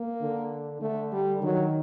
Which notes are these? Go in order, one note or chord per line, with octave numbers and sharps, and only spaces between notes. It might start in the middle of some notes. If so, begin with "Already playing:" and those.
Already playing: A#3
D3
D3 A3
G3
D#3 F#3